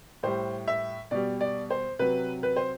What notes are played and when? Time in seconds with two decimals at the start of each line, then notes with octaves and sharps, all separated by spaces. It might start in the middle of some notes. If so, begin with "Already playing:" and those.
0.23 A2 G3 C5
0.68 E5
1.11 B2 G3 D5
1.41 D5
1.70 C5
1.99 C3 F#3 B4
2.43 B4
2.56 C5